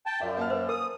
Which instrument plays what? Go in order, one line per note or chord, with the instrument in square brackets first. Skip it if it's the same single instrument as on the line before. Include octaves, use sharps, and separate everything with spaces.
[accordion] G5 A5
[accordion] F#2 [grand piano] F4 D5 E5
[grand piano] A#3 A5 F6
[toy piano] B4 C5
[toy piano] A#4 [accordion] D#6